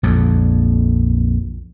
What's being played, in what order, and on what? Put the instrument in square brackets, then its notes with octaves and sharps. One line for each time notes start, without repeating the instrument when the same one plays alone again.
[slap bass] A#1 F2